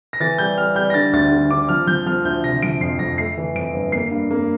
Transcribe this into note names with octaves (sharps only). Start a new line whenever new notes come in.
A#6
E3 A6
G3 G6
G3 F6
G3 G6
A#6
D3 A6
D2 A6
D3
D3 D6
F3 F6
F3 G6
F3 F6
D2 G6
C3 A#6
F3 D7
F2 C7
F2 A#6
A3 C7
E3
F2 D7
G1
A#3 C7
G2
A#3